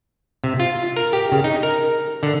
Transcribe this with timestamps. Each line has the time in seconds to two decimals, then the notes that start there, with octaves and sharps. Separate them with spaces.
0.44 C3
0.60 F4
0.96 A#4
1.13 G4
1.32 C#3
1.44 D#4
1.63 A#4
2.23 D3